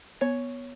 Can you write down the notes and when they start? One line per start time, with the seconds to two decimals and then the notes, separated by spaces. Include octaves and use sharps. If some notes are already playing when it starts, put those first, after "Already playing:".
0.21 B3 C#5